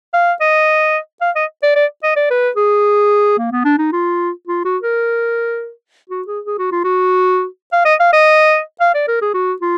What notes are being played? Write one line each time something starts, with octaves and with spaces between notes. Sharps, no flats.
F5
D#5
F5
D#5
D5
D5
D#5
D5
B4
G#4
A#3
B3
D4
D#4
F4
F4
F#4
A#4
F#4
G#4
G#4
F#4
F4
F#4
F5
D#5
F5
D#5
F5
D5
A#4
G#4
F#4
F4